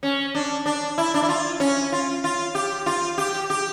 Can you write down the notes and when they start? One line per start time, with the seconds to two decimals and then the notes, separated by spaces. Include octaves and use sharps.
0.03 C#4
0.35 D4
0.66 D4
0.98 E4
1.14 D4
1.22 E4
1.29 F4
1.60 C#4
1.92 F4
2.24 F4
2.55 G4
2.86 F4
3.18 G4
3.50 G4